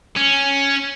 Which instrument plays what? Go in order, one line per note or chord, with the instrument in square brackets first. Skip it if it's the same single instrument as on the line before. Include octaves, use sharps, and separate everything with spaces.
[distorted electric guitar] C#4